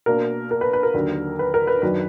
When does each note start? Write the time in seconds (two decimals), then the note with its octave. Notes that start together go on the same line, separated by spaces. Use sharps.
0.06 B2 A#3 D4 A#4
0.51 A#4
0.61 B4
0.73 B4
0.83 A#4
0.94 D#2 D3 F#3
1.39 B4
1.54 A#4
1.67 B4
1.82 F#2 D#3 F#3 D4 B4